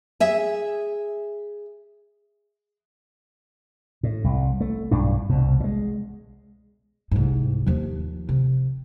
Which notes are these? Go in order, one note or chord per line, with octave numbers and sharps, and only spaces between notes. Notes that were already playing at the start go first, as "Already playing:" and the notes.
G#4 E5
A2
C2
A3
B1 G2 D4
C2 B2
F#3 G#3
C2 G#2
D#2 F3
C3